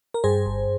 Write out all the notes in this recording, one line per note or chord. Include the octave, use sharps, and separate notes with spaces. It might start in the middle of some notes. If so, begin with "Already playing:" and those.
A#4
G2 G#4 C5
G1